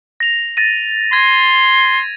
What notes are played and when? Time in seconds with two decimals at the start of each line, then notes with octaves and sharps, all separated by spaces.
0.20 A#6 F7
0.57 A6 A#6 D#7
1.13 C6 G#6